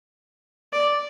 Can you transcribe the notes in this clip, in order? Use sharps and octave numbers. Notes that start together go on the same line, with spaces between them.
D5